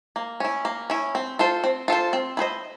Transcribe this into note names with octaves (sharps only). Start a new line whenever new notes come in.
A#3
C#4 E4
A#3
C#4 E4
C4
F4 A4 C5
C4
F4 A4 C5
C4
E4 G#4 C5 D#5